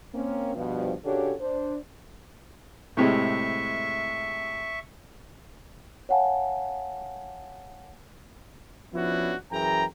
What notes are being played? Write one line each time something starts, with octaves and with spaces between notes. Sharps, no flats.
A#3 C4 C#4
G2 B2 F3
C#3 D4 F#4 G4 A4 C#5
D4 C5
A2 C3 G#3 E5 C#6
C#5 F5 F#5 G#5 A5
F3 B3 C#4 D4 E4 F#4
F#2 E3 G#4 G5 A#5